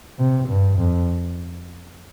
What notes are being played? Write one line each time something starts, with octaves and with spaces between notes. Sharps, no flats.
C3
G2
F2